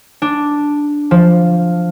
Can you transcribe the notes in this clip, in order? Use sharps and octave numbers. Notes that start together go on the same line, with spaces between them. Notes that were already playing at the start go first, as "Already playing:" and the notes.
D4
F3